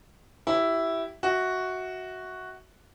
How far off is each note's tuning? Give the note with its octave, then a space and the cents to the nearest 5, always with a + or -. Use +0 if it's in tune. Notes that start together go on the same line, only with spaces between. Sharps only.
E4 +0 G4 -25
F#4 +0 E5 -25